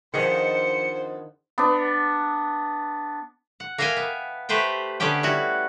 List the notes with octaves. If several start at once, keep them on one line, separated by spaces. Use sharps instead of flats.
F2 D#3 B3 D4 G#4 C5 D#5 C#7
B3 D4
F#5
A#3 A#4 E5 F5 G5 G#5
B3
A3 G4 B4 C5 E5 G5
D3 B3 C#4 G4 G5
G3 E4 F#4